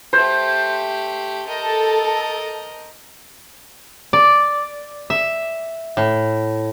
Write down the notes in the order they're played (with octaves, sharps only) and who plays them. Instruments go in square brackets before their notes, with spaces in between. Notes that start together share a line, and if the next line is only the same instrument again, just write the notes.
[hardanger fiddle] A3 G4 [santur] C5
[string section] A4 [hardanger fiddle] A#4 D#5
[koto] D5
E5
A2